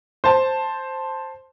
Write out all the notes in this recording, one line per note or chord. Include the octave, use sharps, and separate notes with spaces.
C5 A5